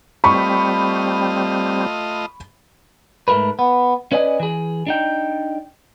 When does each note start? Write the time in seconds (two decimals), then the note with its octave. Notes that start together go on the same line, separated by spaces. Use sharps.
0.24 G3 A3 C4 F4 D#5 B5 C#6
3.28 G#2 A3 G#4 A#4 B4
3.59 B3
4.12 C#4 B4 D5 D#5 G#5
4.40 E3 G#4
4.87 D4 D#4 G5